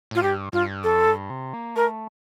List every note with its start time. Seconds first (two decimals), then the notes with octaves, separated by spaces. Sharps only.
0.11 A2 F4
0.22 G2 G4
0.53 G2 F4
0.84 F2 A4
1.07 G2
1.30 C3
1.54 A#3
1.75 A3 A#4